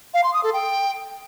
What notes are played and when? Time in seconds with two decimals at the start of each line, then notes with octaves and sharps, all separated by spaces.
0.14 F5
0.24 C6
0.34 D#6
0.44 A4
0.53 G5